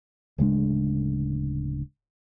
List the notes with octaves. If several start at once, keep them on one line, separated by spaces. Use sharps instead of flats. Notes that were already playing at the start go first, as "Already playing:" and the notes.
D1 C#3 G#3 D4